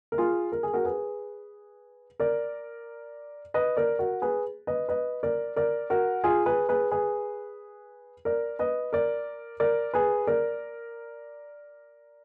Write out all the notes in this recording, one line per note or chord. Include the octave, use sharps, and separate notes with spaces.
A#4
F4 G#4
A#4
G#4
F#4 A#4
G#4 B4
A#4 D5
B4 D#5
A#4 D5
F#4 A#4
G#4 B4
B4 D#5
B4 D#5
A#4 D5
A#4 D5
F#4 A#4
F4 G#4
G#4 B4
G#4 B4
G#4 B4
A#4 D5
B4 D#5
A#4 D5
A#4 D5
G#4 B4
A#4 D5